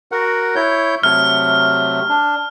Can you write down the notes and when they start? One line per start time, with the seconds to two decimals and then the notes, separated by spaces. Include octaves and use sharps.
0.12 F#4 A#4 F#5
0.55 E4 C#5 G6
1.03 C3 F#3 A3 F6
2.09 D4